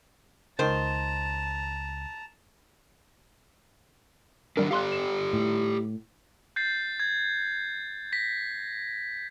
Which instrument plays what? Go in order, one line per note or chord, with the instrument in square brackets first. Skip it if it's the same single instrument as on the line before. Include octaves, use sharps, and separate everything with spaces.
[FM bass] C#2 [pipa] D#3 C5 [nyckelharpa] A5 A#5
[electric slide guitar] D#3 F#3 D4 [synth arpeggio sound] G3 A#4
[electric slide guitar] G4 A4 D5 [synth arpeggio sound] F5 C6 F#6
[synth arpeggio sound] E7
[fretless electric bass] A2
[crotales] G6 A6 C7
G#6
A#6 B6